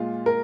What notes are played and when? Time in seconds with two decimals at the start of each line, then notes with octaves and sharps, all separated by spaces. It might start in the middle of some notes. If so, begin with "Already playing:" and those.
Already playing: A#2 G#3 F4
0.26 A#4